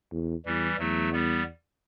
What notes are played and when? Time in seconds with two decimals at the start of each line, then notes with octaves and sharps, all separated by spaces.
0.12 E2
0.45 E2 E3 G3
0.79 E2 F#3 A3
1.12 G3 B3